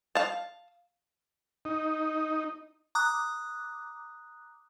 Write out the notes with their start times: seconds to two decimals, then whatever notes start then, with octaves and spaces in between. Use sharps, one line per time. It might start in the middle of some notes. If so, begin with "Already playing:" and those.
0.15 F5 A5
1.65 D#4
2.95 A#5 D6 D#6 F#6